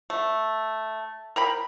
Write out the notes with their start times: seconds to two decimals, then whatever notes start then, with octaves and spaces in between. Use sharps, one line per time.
0.10 A3
1.36 A#4 G5 B5